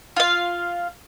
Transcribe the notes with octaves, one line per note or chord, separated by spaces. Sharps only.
F4 F5